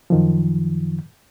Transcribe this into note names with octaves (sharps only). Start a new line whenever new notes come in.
F#2 D#3 F3